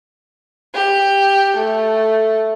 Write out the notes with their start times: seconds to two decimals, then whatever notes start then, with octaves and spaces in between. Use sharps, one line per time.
0.74 G4
1.56 A3